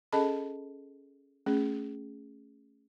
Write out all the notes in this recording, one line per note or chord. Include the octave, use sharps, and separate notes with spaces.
C#4 G#4 A4 D#5 A5 B5
A3 C#4 G#4